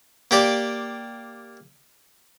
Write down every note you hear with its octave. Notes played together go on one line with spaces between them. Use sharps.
A#3 G4 D5